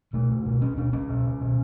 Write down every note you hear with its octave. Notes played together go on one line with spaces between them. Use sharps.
B2 A3
C#2
B2
C#2 C#4
B2 D4
C#2 C#4
B2
C#2
B2